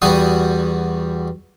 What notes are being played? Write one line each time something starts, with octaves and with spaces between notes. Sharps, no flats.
E2 G3 F#4 D#6